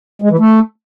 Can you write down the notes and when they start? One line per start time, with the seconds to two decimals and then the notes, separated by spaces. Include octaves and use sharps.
0.22 G#3
0.30 E3
0.39 A3